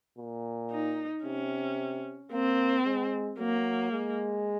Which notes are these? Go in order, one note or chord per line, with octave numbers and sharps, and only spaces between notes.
A#2
D#4
C3 C#4
A#3 C4
G#3
F#3 A#3
G#3